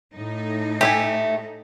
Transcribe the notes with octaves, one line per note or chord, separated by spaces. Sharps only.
A2 D#4
A3 G4 E5 G#5